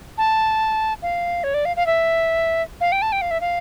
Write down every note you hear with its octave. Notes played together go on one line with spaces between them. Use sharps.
A5
F5
C#5
D5
F5
F5
E5
F5
G5
A5
G5
F5
E5
F5